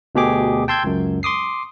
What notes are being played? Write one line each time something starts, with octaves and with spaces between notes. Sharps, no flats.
D2 B2 D3 G4 G#4 D6
G5 A5 C6 E6 G6 G#6
C#2 F#2
C6 D6 D#6 C7